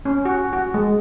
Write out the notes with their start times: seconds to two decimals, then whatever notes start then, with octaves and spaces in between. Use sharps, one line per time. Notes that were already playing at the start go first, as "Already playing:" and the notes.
0.05 C#4
0.25 F#4
0.53 F#4
0.74 G#3